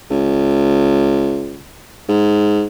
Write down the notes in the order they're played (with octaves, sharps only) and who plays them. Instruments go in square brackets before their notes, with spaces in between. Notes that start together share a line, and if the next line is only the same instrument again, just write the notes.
[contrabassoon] C#2
G#2